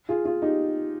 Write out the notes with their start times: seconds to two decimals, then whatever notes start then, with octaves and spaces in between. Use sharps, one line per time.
0.09 F4 G#4
0.25 F4 G#4
0.42 D#4 G4